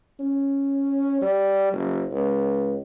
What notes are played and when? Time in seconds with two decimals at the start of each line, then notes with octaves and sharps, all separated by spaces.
0.20 C#4
1.22 G3
1.73 F#1
2.12 C#2